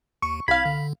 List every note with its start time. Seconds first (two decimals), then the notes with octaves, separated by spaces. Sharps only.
0.22 D#2 C#6
0.48 C2 F5 B5 G#6
0.65 D3